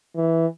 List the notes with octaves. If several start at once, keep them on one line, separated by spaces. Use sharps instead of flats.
E3